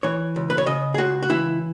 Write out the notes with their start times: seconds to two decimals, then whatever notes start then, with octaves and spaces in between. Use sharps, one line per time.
0.03 E3 C#5
0.36 C#2
0.50 B4
0.58 C#5
0.66 C#3 D#5
0.94 G#4
0.98 C#2 F#4
1.23 F#4
1.30 E3 E4